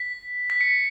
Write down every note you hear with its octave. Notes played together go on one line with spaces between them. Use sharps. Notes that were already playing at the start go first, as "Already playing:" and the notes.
Already playing: B6
B6
C#7